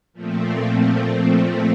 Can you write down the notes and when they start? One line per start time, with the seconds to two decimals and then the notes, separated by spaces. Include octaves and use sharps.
0.13 A#2 F3 A3 C4